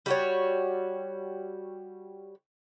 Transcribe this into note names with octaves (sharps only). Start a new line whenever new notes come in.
G3 F#4 C#5